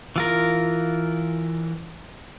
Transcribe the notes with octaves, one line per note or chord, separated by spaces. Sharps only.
E3 F4 A#4